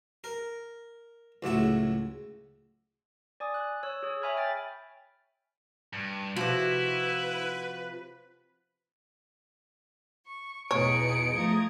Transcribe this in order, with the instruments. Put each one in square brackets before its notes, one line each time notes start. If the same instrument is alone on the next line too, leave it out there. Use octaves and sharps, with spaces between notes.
[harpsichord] A#4
C#2 A2 F#3 E5
[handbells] D5 G#5 D#6
F#6
C#5 E6
G#4 C#5
C#5 E5 G#5 B5 F6 G#6
E5 G5 A6
[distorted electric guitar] G2
[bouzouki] C3 F3 [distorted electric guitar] E4 [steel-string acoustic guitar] F#4 [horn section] B4
[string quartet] C#6
[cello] E2 B2 [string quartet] D#4 G#4 [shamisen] C#5 [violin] C#7 D7
[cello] F3 A3 [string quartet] D#5 A#5 G#6